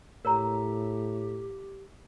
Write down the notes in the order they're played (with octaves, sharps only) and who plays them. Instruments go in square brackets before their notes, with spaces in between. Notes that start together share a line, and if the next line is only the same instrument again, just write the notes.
[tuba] A2 [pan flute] G4 [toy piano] A#4 C#5 A#5